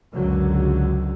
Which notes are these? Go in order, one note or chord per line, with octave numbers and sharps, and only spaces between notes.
C#2 F#2 D3 F#3